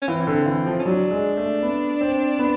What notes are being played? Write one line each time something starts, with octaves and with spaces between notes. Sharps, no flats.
C#4
E3 C4
D3
E3
F3
C#4
F#3 D4
G#3
A3
B3
C4
B3